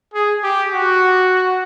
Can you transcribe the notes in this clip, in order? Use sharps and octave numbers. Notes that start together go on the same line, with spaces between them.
G#4
G4
F#4